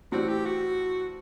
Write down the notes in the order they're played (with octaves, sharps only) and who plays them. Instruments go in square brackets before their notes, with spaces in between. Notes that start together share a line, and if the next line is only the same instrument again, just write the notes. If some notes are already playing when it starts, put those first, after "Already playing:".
[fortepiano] A2 E3 G3 C4 [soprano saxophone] F#4
[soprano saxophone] G4
F#4